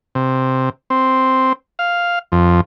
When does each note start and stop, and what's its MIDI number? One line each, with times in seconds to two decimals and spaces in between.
0.15 0.69 48
0.90 1.53 60
1.79 2.19 77
2.32 2.61 41